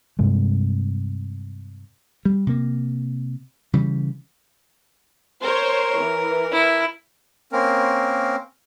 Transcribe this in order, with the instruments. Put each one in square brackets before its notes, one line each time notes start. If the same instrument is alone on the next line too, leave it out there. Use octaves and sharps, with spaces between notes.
[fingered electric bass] G2 C3 G#3
[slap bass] G3
C3 A#3
C#3 E3 G3
[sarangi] A#4 [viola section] C5 C#5
[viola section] E3
[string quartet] E4
[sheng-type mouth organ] A#3 C4 C#4 A#4